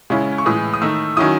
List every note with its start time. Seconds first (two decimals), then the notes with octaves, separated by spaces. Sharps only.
0.10 C#3 G#3 C#4 E4
0.38 C#6
0.46 A2 E3 G#3 D#6
0.74 D#6
0.82 D#3 A3 D#4 E6
1.17 D#3 F#3 C#4 E4 D#6